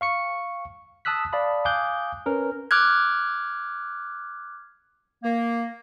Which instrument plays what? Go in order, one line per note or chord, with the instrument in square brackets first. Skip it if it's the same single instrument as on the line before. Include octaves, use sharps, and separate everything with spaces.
[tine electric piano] F5 C#6 C#7
A5 D#6 E6 F#6 B6
D5 F5 A5 B5 D#6
F5 G#5 D6 D#6 F#6 G6
C#4 A#4 B4
[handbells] D6 F6 F#6 G#6
[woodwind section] A#3